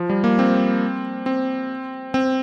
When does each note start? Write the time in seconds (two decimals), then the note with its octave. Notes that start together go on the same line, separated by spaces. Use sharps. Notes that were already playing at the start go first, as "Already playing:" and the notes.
Already playing: F3
0.09 G3
0.24 A#3
0.39 C4
1.26 C4
2.14 C4